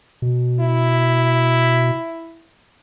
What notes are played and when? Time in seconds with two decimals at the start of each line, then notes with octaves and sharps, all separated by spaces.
0.22 B2
0.60 E4